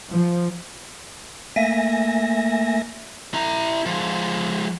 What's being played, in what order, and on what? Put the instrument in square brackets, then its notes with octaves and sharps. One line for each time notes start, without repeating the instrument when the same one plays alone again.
[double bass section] F3
[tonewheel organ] A3 A#3 E5 G#5 A#6
[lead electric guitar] E4 A#5
F3 G#3